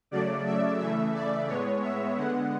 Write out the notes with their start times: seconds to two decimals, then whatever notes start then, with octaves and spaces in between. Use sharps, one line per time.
0.11 C#3 F#3 A3 D5
0.46 E5
0.80 C#3 E3 A3 E5
1.14 D5
1.48 A2 G#3 B3 C#5
1.83 E5
2.17 D3 G#3 B3 F#5